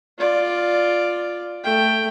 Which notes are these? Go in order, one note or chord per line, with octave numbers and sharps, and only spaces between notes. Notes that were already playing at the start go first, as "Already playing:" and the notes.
F4 D5
A3 G5